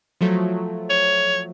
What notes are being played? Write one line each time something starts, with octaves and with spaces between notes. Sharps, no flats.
F3 F#3 A3
C#5